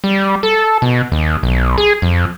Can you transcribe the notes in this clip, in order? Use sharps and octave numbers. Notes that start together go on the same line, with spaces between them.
G3
A4
B2
D#2
B1
G#4
F2